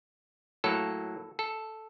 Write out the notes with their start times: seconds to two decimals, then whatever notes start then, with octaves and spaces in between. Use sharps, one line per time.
0.64 A2 F#3 A#3 A4
1.39 A4